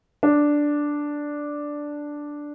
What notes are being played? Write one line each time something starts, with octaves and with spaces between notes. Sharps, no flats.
D4